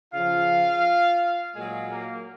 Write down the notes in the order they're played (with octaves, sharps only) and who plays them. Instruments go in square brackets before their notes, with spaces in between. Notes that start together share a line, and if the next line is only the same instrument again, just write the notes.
[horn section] C#3 F3 F4 F5
A#2 F#3 G#3 G#4
A#3 A#4